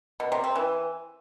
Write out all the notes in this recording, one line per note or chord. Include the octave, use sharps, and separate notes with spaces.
B2
C3
C4
E3